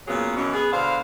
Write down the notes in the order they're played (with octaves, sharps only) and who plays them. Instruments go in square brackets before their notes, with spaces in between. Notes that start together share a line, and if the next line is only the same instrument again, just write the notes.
[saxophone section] A#2 C#3 F#3 B3 G#4
F#2 B2 E3 C#4
B3 G#4
B2 D3 C5 F5